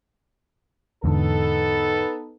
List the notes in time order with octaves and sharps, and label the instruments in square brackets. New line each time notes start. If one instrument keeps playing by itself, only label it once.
[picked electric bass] E2 G#2 D3 [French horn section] B3 D#4 A4